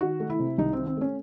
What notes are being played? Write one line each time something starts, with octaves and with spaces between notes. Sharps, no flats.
D#3 F#4
A3
E4
C3
C2 D#4
D#3 C4
C4
A3 C#4